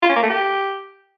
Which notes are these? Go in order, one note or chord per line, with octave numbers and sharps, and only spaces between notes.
F4
C#4
A#3
A3
G4